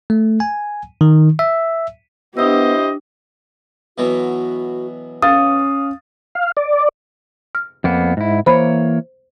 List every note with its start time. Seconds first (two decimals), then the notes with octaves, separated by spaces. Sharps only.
0.10 A3
0.40 G#5
1.01 D#3
1.39 E5
2.37 B3 D4 E4 G4 C5 D#5 D#6 E6
3.98 B2 E3 F#3 F#4
5.22 C#4 F5 D#6 A6
6.35 F5
6.57 D5
7.55 F6
7.84 F2 A#3 B3
8.17 G#2 E4
8.46 E3 A#3 C5 C#5 B5